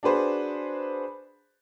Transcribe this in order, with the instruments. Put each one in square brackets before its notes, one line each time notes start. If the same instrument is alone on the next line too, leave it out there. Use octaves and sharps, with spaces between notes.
[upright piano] D4 F#4 G#4 B4 C5